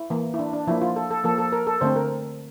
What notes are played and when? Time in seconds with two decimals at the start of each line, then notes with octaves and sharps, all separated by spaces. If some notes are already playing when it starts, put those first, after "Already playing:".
Already playing: E4
0.10 E3 A#3
0.34 E4
0.39 D4
0.53 D4
0.67 F3 A#3 E4
0.82 F4
0.96 A4
1.11 A4
1.24 F3 A#3 A4
1.38 A4
1.52 A#4
1.67 A4
1.81 D3 A3 C4 C5
1.96 A#4